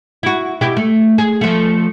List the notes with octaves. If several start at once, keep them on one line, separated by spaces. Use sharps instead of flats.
E4 F#4
B2 E4 G4
A3
G#4
F3 A3